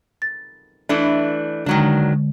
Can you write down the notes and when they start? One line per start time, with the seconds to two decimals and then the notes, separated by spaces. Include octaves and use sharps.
0.22 A6
0.89 E3 A3 D4
1.66 D3 D#3 F#3 G#3 D4